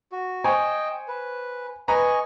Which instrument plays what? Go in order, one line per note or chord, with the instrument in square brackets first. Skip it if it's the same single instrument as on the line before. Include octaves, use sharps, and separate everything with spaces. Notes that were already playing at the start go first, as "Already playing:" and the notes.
[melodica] F#4
[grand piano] C5 G#5 C#6 [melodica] D#5 G5
[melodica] B4
[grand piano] B4 A#5 [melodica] D#5 G#5 C#6